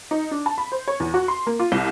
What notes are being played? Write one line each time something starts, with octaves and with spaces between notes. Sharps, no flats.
D#4
D4
A5
B5
C5
C#5
E2
F#4
C6
A#3
F4
C2